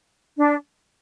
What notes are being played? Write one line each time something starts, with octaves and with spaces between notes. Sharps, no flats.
D4